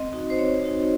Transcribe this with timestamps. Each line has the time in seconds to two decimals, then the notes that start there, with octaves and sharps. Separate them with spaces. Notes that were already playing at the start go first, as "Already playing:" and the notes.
Already playing: C4 D#5
0.13 D#4 F#4
0.30 C5
0.39 C4 C#5
0.64 D#4 F#4